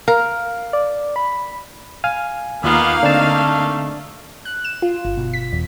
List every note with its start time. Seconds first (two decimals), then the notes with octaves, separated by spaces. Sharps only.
0.08 A#4 F5
0.73 D5
1.16 B5
2.04 F5 G#5 F6
2.64 D#2 A#3 B3 D#4 F4 F5 A#5
3.03 D3 A3 C4 D4 A5
4.45 F#6
4.64 E7
4.82 F4
5.05 G1
5.17 B2
5.33 B6
5.52 E2